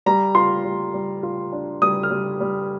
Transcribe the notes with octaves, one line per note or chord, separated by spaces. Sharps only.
G3 A#5
F4 C6
G3
G3
F4
D4
G3 D#6
F6
G3
G3